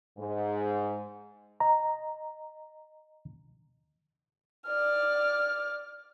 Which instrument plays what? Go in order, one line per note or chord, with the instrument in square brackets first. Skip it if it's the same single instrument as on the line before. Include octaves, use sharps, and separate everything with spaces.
[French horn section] G#2
[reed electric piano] D#5 A#5
[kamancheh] D5 F6